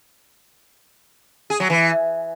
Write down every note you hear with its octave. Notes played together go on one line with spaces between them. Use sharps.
G#4
F#3
E3